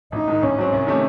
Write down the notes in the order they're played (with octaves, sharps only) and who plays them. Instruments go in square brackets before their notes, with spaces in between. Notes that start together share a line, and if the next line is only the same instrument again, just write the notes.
[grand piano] A1 [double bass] D#4
[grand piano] G#2 D#3
[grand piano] A1 [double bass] C#4
[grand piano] G#2 F#3 C4
C2
C3 D#3 A3